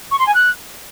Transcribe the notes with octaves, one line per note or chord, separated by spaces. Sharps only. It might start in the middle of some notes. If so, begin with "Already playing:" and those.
C#6
C6
G#5
F#6